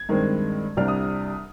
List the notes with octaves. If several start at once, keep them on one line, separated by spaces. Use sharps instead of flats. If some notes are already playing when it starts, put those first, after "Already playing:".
Already playing: G#6
G2 D#3 G#3 C4
C2 C3 G3 D4 F6
D#6